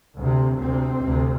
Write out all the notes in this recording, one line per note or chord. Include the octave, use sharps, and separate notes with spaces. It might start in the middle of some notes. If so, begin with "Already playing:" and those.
D2 C3
D2 C3 C4
D2 C3